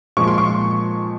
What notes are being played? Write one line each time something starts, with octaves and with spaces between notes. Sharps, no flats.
A#2 F3 G#3 C#6
C6
C#6